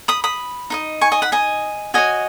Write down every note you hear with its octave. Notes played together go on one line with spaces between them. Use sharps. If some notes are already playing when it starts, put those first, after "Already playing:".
B5 D#6
B5 D#6
D#4 B4 D#5
G#5 C#6
D#5 G#5
F#5 B5
D#5 G#5
F#4 C#5 D#5 G#5